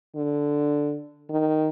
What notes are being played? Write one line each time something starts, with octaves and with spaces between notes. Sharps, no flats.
D3
D#3